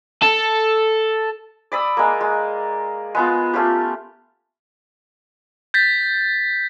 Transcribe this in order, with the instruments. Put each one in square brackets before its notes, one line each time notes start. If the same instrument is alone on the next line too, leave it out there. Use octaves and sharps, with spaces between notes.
[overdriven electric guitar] A4
[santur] D5 B5 D#6 E6
G#3 A#3
G#3
G#3 B3 F4
A3 C#4 F4 G4
[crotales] G6 A6 B6